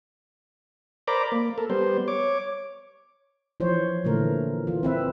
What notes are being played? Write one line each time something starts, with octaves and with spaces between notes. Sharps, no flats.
A#4 C5 D5 A#5 B5 D6
A#3
A4 A#4
G3 B3 C5
C#5 D6
E3 F3 C5 C#5
A#2 D3 E3 A3 A#4
E3 F4
C4 B4 E5